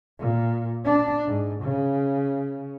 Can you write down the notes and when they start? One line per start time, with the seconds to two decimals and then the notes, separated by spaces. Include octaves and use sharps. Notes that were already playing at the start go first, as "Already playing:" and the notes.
0.19 A#2
0.85 D4
1.27 G#2
1.63 C#3